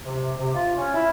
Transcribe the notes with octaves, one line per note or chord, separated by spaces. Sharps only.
C3
C3
F4
C#4
E4